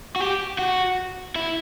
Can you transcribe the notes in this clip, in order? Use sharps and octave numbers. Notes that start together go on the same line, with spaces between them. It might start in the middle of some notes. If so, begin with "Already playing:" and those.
F#4
G4
F#4
E4